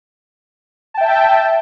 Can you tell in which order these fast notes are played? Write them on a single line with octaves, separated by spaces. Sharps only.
A5 G5 E5